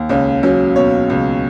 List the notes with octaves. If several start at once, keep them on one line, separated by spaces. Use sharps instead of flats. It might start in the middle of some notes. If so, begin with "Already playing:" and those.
Already playing: D#2
C#2 C#4
F#3 C#4
B2 C#5
C#2